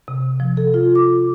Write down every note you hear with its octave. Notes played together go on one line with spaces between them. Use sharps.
C3
F3
A4
F4
D6